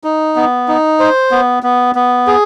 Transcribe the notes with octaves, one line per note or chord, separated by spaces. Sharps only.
D#4
B3
D#4
C5
B3
B3
B3
G#4